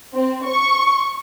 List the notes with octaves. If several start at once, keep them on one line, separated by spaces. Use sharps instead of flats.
C4
C#6